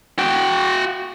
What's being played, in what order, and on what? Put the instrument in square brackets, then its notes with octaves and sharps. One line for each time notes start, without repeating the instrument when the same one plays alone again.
[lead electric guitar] F#4 G5